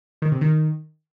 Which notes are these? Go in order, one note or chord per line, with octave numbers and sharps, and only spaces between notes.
D#3
C3
D#3